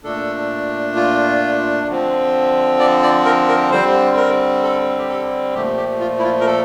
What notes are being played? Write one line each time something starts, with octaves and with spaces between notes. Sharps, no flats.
A#2 A3 D4 A4
F4
D3 F3 C4
D5
D5
A#4
A#4
D3 G3 C4 C5
A#4
A4
G4
A4
A#2 F3 A3 G4
G4
F4
E4
F4
A#4
A4